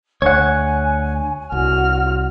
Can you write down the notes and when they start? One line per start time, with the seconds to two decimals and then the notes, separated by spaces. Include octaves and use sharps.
0.22 D2 C#5 F#5 G#5
1.52 C2 F#4 F6